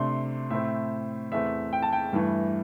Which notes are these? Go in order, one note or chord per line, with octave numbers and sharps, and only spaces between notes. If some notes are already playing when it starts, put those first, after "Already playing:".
Already playing: C3 A3 D4 C6
A2 A3 C4 E5
E2 E3 A3 C4 E5
G5
A5
G5
G2 E3 A3